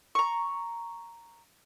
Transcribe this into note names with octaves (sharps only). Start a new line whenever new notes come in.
A#5 C#6